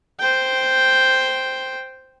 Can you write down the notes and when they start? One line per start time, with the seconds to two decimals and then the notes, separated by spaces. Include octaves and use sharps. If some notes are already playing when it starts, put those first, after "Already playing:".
0.20 C5 G5